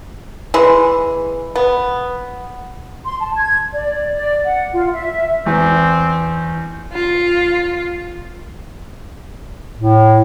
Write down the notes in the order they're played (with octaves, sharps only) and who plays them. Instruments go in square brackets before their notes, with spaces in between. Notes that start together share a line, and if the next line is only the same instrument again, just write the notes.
[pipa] E3 G#3
B3
[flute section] C6
A5
G#6
D5
D5
F#5
F4
E5
[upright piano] E2 [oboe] C4
[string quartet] F4
[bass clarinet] A2